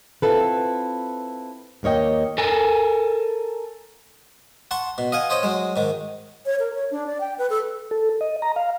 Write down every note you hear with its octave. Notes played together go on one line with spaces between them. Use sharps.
C4 C#4 E4 F4 A4 B4
D#2 A#3 C#5 D#5 G5
A4 A#4 G#5
F#5 A5 C6 C#6
B2
D#5 F5 F#5 G#5
C5 C#5 D#5 C6
F#3 G#3
G#2 D#3
C#5
A#4
C#5
D4
D5
G5
B4
A4
A4
D#5
A#5
F5